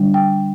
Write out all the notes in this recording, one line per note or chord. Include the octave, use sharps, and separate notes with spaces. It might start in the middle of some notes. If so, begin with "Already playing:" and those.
Already playing: D3 G3 D4
G5